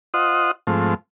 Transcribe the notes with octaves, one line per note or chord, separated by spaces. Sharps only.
F4 C5 D#5 F#5 D#6
G#2 F3 A3 C4